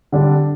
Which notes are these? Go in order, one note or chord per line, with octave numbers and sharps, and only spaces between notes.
D3 G3 D4